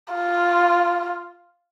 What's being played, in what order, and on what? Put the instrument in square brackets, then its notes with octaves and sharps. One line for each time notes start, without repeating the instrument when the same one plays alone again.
[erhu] F4